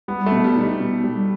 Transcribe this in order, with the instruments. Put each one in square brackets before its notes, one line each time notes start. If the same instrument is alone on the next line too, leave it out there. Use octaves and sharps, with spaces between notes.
[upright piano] G3 [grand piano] B3
[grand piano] A3
[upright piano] B2
[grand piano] G3
[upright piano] D#4
[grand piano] G3
[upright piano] B2
G3